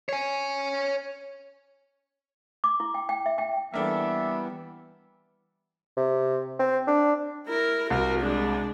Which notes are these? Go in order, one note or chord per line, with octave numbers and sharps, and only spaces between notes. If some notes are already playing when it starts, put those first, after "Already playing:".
C#5 G#5
D6
E4
G5
G5
E5
G5
E3 G3 A#3 B3 D4 A4 E5
C3
C4
D4
E4 A#4
C2 F#4 A#4
G#3 D4